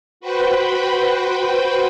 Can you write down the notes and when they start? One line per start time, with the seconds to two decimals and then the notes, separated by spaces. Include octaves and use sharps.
0.20 F#4 B4 C5 G5 B5